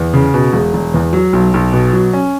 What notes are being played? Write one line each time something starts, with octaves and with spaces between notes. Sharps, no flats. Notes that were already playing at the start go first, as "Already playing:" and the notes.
Already playing: E2
C#3
B2
E1
E1
E2
F#3
B1
B1
B2
F#3
C#4